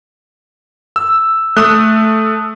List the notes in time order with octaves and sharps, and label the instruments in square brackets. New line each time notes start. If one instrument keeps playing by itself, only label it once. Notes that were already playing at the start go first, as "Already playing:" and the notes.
[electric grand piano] E6
[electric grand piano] A3 [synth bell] D#6 F#6